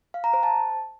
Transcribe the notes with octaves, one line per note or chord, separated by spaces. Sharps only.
F5
A#5
C5
A5